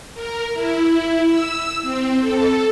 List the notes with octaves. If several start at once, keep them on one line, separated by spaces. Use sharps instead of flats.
A#4
E4
E6
C4
A4